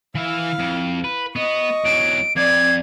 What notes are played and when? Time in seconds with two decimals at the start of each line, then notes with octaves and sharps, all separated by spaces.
0.15 E3 E4 E5 F5
0.59 F2
1.04 B4
1.36 B3 D#5 C#6
1.85 E2 F#3 D7
2.36 F2 D5 G#6